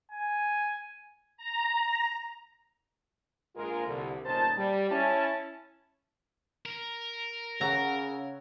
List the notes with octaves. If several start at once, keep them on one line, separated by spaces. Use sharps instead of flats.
G#5
A#5
A#1 G#3 F4 A#4
C2 D3
G1 A#2 C#4 D#4 C5 A5
G3
C#4 E4 A5
A#4
C#3 C#5 F#5 A#5 E6